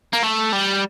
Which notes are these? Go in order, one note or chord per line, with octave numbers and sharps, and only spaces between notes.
A#3
A3
G3